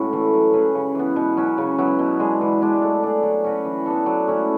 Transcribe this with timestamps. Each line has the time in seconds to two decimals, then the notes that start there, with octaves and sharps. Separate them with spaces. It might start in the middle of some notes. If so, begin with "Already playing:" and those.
Already playing: A2 C#4 E4 F#4
0.13 E3 A3
0.34 F#3
0.53 C#4 G#4 B4
0.75 C#3
0.95 E3 B3
1.16 B2
1.37 F#3 C#4
1.58 C#3
1.78 F#3 B3 E4
1.99 B2
2.20 G#3 D4 G#4
2.41 E3
2.61 G#3 B3 D4
2.82 A3
3.03 D4 G#4
3.23 F#3
3.44 C#4 F#4 B4
3.65 E3
3.86 B3 D4 A4
4.06 F#3
4.27 A3 C#4 E4